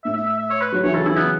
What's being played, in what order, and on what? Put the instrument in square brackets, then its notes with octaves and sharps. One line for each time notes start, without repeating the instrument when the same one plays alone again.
[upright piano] A2 [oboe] E5
[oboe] E5
E5
E5
C#5
B4
[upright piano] F#3
[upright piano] E3 [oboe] C#5
[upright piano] C#3 [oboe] A4
[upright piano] E3 [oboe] E4
[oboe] B3